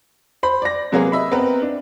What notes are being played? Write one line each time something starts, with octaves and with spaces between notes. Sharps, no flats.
C5 B5
D5 A#6
C3 F#3 G#3 A#3 B3 G#4
D#5 E5 B5
B3 C4 A#4 B4
D4